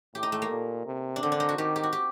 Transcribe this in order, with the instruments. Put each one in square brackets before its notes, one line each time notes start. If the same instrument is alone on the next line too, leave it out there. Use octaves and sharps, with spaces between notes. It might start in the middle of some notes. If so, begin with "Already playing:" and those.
[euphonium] A2 [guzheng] G4
[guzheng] D#4
A3
A#3
[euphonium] A#2
C3
[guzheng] D4
[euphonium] D3 [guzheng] C4
[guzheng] D4
D#4
F#4
[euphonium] D#3 [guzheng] G4
[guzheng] G4
F#4
G4